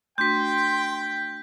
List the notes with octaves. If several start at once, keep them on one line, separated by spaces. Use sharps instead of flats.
A3 D4 F#4 G5 C6 G6 B6